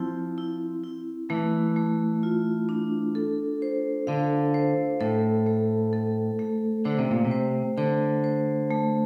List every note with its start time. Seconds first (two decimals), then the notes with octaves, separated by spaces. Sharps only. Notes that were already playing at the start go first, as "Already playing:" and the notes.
Already playing: F3 C4 E4
0.38 E4
0.84 E4
1.30 E3 A3
1.76 A3
2.23 F4
2.69 D4
3.15 A4
3.62 C5
4.07 D3 F5
4.54 C5
5.01 A2 A4
5.46 A3
5.93 A4
6.39 A3
6.85 D3 C5
6.98 C3
7.11 A#2
7.25 C3
7.31 C5
7.78 D3 C5
8.24 C5
8.71 A3